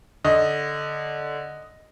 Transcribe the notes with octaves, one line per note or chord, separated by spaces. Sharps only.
D3 D#5